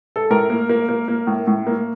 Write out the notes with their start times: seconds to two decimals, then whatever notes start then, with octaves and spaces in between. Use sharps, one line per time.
0.16 A4
0.30 A2 A#4
0.50 A#3
0.69 A#3
0.89 A#3
1.08 A#3
1.27 A2
1.47 A2
1.67 A#3